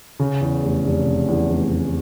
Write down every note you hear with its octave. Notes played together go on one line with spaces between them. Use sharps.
C#3
E2
F1
F1
C#3
E2
F1
F1